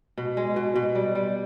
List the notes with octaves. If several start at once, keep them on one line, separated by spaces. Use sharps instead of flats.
B2
G#3
B2
B2
G3
G3